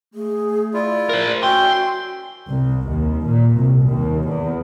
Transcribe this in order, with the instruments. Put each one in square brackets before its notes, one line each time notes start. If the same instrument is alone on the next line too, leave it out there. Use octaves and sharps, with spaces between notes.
[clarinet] A3 [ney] G#4
[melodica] E4 F4 [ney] D5
[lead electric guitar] A#4 C5
[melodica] C#4 E5 [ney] F#4 [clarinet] G5 [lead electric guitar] C6
[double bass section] C2
D#2
A#2
C2
D#2
E2